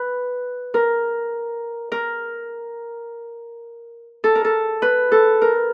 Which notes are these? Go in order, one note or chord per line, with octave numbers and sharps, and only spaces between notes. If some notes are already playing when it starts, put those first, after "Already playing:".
Already playing: B4
A#4
A#4
A4
A#4
A4
B4
A4
A#4